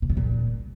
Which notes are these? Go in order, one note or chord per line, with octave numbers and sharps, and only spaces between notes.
B2
C3
A#2